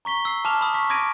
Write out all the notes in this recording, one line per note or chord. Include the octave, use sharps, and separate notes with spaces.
A#5 C#6 B6 G7
E6 C7
A5 D6 F6 E7 F7
B5 D#6
C#6 B6
B5 D6 G#6 A#6 D7 D#7